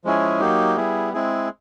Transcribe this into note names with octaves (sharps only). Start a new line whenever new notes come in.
F3 G#3 C#4 E4 G#4
F#3 A#3 D#4 G4
G3 B3 E4 G#4
G#3 C4 E4 G#4